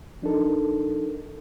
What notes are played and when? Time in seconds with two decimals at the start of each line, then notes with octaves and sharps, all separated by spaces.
0.22 F3 D4 D#4 A4 A#4